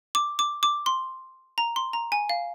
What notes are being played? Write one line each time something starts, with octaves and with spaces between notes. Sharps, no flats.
D6
D6
D6
C6
A#5
C6
A#5
G#5
F5